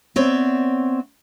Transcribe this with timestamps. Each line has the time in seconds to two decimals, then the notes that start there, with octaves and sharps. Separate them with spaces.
0.16 B3 C4 C#5 D5 E5